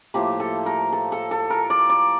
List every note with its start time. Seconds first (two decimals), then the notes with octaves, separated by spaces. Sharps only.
0.14 A2 F3 A#3 G4
0.40 A4
0.66 A#4
0.93 A4
1.12 A4
1.31 A4
1.50 A#4
1.70 D5
1.90 D5